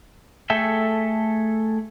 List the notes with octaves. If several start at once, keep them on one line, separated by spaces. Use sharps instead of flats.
A3 G#4 A4 E5 G5